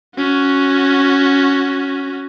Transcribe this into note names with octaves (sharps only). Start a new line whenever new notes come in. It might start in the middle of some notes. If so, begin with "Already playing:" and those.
C#4 F#4